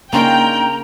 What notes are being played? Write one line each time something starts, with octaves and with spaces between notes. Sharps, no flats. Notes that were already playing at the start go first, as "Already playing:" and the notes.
C#3 A#3 D4 D#4 F4 A#4 G5 A#5